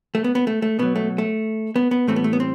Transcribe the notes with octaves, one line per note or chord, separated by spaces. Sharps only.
A3
B3
B3
A3
A3
B2 F#3 B3
A3
A3
B3
B3
A2 E3 G3 A3 C4
B3
A3
B3
C4